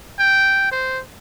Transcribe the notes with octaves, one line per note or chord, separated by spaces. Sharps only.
G5
C5